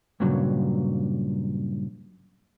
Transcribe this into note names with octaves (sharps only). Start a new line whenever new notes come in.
G2 A#2 C#3 F#3